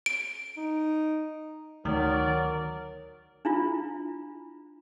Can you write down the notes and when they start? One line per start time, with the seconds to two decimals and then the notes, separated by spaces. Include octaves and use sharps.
0.06 D7
0.57 D#4
1.85 D2 D#3 F#3 A#4 D5
3.45 D4 E4 F4